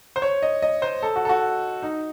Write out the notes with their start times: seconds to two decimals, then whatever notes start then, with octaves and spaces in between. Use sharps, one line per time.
0.16 C5
0.22 C#5
0.43 D#5
0.62 D#5
0.82 C5
1.03 A4
1.16 F#4
1.25 A4
1.29 F#4
1.82 D#4